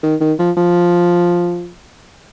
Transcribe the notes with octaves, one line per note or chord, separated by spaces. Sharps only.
D#3
D#3
F3
F3